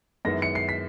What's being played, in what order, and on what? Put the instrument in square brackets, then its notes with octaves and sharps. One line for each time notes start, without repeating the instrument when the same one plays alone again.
[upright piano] F#2 D#3 G#3 B3 E4 [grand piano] A#6
[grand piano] C#7
C7
B6